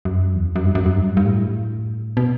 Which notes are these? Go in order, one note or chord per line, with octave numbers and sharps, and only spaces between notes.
F#2
E2
F#2
F#2
G2
F#2
F#2
G2
G2
A2
B2